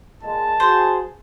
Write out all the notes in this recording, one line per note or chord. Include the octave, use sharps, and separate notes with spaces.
A#2 G#3 A5
F#4 G#4 C5